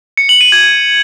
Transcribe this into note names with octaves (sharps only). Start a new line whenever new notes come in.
C#7
F#7
D#7
G#6